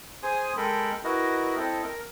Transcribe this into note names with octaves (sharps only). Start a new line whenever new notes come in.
G#4 C5 G#5 D#6
G#3 A4 A#4 G5 B5
E4 F#4 A#4 B4 D#5
C4 E4 A4 D#5 G5
A#4